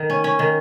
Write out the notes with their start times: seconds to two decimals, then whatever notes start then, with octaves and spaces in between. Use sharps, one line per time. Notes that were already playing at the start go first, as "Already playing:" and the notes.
Already playing: D#3
0.10 C#4
0.24 C#4
0.39 D#3